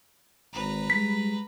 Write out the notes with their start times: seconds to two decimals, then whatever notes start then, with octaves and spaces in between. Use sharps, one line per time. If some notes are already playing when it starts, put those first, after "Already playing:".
0.53 G#1 B4 A#5
0.90 G3 G#3 B6